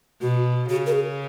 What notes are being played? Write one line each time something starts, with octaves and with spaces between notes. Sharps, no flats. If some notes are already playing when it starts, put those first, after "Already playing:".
B2 F#4
C#3 F#4
A#4
G#4